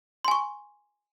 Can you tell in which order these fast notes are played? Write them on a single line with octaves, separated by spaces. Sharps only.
C6 G#5 C#6